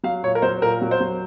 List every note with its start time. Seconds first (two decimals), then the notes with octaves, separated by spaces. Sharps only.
0.03 F#3 F5
0.23 A#2 C#5
0.35 A#4
0.42 F#3 C5
0.62 A#2 A#4
0.82 F#3
0.91 C5
1.00 F#3